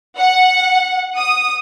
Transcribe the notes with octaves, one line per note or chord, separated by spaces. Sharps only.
F#5
D#6